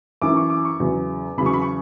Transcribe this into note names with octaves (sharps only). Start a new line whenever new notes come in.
F#2 E3 D6
C#6
D6
C#6
E2 C#3 F#3
E2 C#3 F#3 B5
C#6
B5
C#6